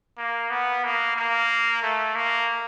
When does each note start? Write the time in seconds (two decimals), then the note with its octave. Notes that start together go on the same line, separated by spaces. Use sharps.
0.18 A#3
0.50 B3
0.84 A#3
1.16 A#3
1.82 A3
2.15 A#3